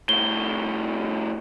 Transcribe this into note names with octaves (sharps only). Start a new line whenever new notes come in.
C2 A2 G7